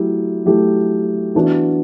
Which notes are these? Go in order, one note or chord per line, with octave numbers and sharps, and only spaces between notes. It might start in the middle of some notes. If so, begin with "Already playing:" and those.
Already playing: F#3 A3 E4 G4
F#3 A3 E4 G4
E3 B3 D4 F#4